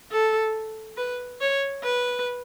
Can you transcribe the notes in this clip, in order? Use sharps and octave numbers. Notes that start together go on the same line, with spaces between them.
A4
B4
C#5
B4